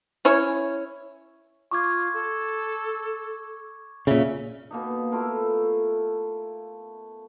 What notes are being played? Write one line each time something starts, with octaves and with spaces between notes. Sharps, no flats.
C#4 E4 C#5
F4 C#6 D6 G#6
A4
A#2 C#3 E5
B2 A#3 D#4
A3 E4 F4 A#4